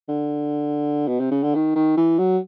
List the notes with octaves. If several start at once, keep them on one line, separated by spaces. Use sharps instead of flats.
D3
B2
C3
C#3
D3
D#3
D#3
E3
F#3